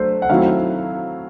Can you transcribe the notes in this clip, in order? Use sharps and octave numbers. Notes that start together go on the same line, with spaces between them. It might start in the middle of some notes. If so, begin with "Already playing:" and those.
Already playing: F#3 A3 D4 C5
F#5
D#3 F#3 A3 C4 E4 F5